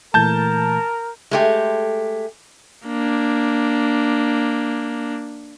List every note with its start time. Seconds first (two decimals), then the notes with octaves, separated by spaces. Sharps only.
0.14 A#2 E3 A3 A#4 A5 G6
1.31 G#3 A3 G4
2.86 A#3 D4